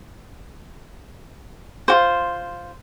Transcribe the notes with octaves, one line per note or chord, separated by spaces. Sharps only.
F4 F#4 C5